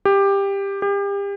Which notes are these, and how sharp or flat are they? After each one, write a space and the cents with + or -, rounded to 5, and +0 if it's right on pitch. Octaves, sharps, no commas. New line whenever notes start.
G4 +15
G4 +35